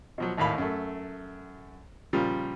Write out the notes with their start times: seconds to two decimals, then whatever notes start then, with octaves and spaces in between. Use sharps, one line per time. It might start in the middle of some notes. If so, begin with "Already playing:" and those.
0.18 B2 F3 F#3
0.37 G#1 D#2 A2 F5 B5
0.58 F#2 A3
2.13 A#2 C#3 F3 G3 F4